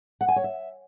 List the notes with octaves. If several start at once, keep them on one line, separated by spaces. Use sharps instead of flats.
F#5
G#5
C#5
E5